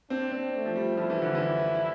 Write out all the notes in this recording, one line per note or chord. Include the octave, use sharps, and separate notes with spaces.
C4 D4
C4
A3
F3
G3
F3 E4
E3
D3
E3